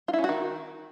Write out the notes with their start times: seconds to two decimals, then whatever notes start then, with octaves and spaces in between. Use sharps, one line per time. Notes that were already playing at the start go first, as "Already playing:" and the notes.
0.08 F4
0.13 E4
0.19 C#4
0.24 F#4
0.29 D#3